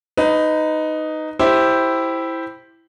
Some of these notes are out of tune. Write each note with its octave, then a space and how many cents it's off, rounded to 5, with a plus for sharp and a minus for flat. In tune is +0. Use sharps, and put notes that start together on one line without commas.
D#4 +0 B4 +20
E4 +0 G4 +0 C5 +0